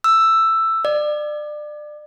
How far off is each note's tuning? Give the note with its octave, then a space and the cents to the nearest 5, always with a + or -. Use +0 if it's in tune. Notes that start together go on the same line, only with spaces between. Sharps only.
E6 +10
D5 +30